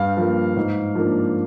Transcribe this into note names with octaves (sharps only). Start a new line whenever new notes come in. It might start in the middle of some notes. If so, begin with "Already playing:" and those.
Already playing: G2 F5
F3 A#3
G#2
F3 A#3 D4